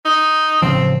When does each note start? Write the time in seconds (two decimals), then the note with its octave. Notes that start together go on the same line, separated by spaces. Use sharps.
0.05 D#4
0.62 A1 C#3 F3 C4